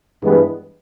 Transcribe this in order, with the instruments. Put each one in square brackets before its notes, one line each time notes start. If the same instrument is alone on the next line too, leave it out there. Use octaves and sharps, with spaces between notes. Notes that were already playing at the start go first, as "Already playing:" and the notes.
[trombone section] G2 E3 G#3 B3